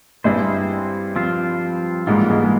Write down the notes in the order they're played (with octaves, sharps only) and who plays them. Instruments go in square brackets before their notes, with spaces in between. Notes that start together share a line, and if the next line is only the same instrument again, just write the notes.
[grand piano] G2 G3 [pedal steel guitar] C4 E4 G#4 C5
[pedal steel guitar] F3 C4 F4 C5
[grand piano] G#2 G#3 [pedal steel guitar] E3 G3 A#3 F4
[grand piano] G#2 G#3
G#3